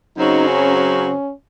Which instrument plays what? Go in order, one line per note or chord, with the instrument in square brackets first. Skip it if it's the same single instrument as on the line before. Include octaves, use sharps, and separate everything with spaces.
[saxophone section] F#2 C#3 F#3 C4 F#4 [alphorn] D#4
[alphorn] C#4
C#4